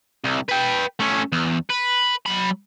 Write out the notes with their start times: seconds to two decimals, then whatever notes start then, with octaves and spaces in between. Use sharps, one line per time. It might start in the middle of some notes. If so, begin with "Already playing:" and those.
0.24 C2
0.49 B4 G5
1.00 A3 C#4
1.32 E2
1.70 B4
2.26 F#3 B5